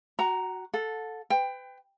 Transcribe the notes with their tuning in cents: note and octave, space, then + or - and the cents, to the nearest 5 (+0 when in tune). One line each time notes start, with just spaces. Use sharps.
F#4 +0 F#5 +40 A#5 +0
A4 +0 F#5 -40
B4 +35 G5 +15